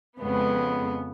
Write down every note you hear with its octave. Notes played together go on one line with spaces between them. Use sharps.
F2 C#3 G#3 B3